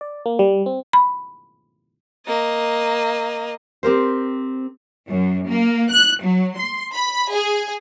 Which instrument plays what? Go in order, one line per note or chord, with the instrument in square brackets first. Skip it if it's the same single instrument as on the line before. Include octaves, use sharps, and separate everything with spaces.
[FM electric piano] D5
A#3
G3
C4
[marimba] B5
[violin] A#3 D#5
[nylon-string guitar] C4 G4 A#4 C5
[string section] F#2
A#3
F#6
F#3
C6
B5
G#4